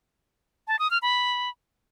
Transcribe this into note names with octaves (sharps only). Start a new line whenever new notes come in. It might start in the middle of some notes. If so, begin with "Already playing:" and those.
A5
D#6
F6
B5